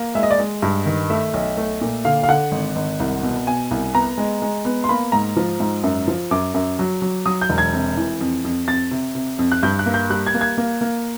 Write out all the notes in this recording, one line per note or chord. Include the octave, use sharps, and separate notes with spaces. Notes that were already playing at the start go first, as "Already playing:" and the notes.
Already playing: A#3
G#3 E5
D#5
D5
G#3 D#5
G2
D#3
A3 E5
B1
A3
A#2
D3 F5
F5
D3 F#5
G#1
G#1
C2
B2
B2 G#5
C2
B3 A#5
G#3
G#3
B3
C6
A#3 B5
G#2 A#5
F3
G#2
F#2
F3
F#2 D6
F#2
F#3
F#3
F#3 D#6
G6
E1
G#6
C3
E3
F2
F2
F2 A6
C3
C3
F2
F#6
G2 G6
F#6
A#3
G6
G3 F#6
G#6
A#3
G#6
A#3
A#3